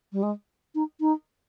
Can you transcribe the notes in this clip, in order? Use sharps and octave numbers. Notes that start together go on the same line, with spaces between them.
G3
G#3
D#4
D#4